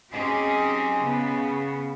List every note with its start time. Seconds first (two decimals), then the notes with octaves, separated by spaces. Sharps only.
0.12 F#3 C4 C#4 D#4 G4 G#4
1.02 C#3 B3